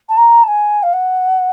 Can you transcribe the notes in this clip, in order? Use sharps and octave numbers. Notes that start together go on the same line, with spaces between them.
A5
A#5
A5
G#5
F5
F#5